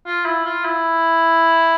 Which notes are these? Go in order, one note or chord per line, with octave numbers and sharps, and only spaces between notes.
F4
E4
F4
E4